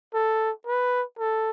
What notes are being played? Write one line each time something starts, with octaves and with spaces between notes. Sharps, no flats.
A4
B4
A4